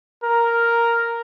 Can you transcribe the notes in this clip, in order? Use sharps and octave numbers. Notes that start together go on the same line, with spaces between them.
A#4